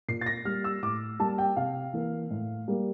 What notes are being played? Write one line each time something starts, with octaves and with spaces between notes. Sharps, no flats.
A#2 C7
A6
A#6
G3 A#3 F6
E6
A2 D6
G3 A#3 A5
G5
C3 F5
E3 A#3
A2
G3 A#3